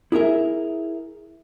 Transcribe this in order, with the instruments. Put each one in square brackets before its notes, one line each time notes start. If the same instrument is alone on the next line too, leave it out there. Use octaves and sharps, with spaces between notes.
[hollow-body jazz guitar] E4 G#4 A#4 E5